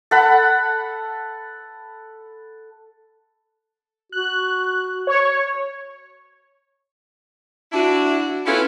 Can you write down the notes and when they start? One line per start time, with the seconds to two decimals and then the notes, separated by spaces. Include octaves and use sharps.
0.11 A4 F#5 B5
4.12 F#4 F#6
5.07 C#5
7.72 D4 E4 F#4
8.46 B3 C#4 E4 F4 A4 B4